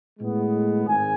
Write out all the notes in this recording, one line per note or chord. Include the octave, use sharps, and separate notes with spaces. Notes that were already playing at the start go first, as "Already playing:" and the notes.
A2 G#3 B3
G#1 G#5